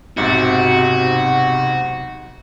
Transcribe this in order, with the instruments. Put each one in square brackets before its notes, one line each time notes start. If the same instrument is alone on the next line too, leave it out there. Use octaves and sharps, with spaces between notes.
[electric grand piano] B1 G#2 [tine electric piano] C3 F#5 A6 [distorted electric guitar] F#4